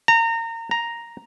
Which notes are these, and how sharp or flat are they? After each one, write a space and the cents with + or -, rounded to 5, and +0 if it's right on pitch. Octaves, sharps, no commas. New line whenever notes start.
A#5 -30
A#5 +0